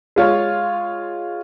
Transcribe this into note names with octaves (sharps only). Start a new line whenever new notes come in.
G#3 F4 C#5